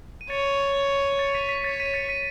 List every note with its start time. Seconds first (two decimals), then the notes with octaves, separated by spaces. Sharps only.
0.21 D#7
0.30 C#5 A6 C#7
1.19 A6 C#7
1.35 B6 D#7
1.49 B6 D#7
1.64 C#5 A6 C#7
1.80 B6 D#7
1.94 A6 C#7
2.09 B6 D#7